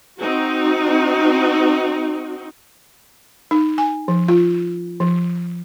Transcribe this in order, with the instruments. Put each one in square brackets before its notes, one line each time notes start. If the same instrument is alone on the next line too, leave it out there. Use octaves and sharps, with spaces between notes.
[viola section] C4 D#4 F#4
[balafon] D#4
G#5
F3
F4
F3